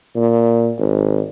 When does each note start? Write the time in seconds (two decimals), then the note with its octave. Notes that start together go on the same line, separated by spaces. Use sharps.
0.16 A#2
0.79 G#1